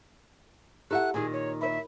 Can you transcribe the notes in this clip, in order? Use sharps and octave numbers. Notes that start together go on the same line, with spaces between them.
E4 G4 A4 E5 F#5 F#6
A#2 D#3 G#4
C#5
F4 A#4 C#5 E5